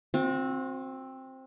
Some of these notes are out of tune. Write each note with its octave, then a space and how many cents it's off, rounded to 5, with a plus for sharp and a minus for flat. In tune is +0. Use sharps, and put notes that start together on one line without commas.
C4 +10 F#4 -35